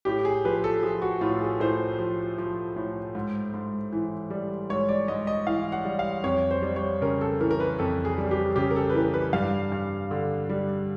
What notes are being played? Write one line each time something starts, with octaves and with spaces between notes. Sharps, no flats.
A2 G4
G#4
F3 B4
A4
F3 G#4
F#4
A2 F4
G#4
A2 C5
F3
F3
A2
G#2
G#2
E3
G3
G#2 C#5
D5
G#2 D#5
D#5
E3 F5
F#5
G3
F5
F2 C#5
C5
G3
C#5
C#3 A#4
A4
E3 A#4
A#4
B4
F2 A4
G#4
G3
G4
C#3 G4
A#4
A4
B4
E3 A#4
B4
G2 F5
G2
D3
G3